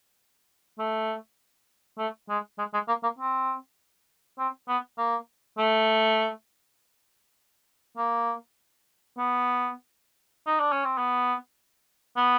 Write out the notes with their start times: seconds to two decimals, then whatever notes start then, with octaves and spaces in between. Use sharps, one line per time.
0.79 A3
1.98 A3
2.29 G#3
2.59 G#3
2.74 G#3
2.88 A#3
3.03 A#3
3.19 C4
4.39 C4
4.68 B3
4.98 A#3
5.58 A3
7.97 A#3
9.18 B3
10.47 D#4
10.60 D4
10.72 C#4
10.85 C4
10.98 B3
12.17 B3